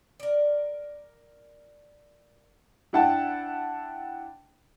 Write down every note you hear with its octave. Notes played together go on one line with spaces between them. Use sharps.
A#4 D5
D4 E4 F#5 G5 A5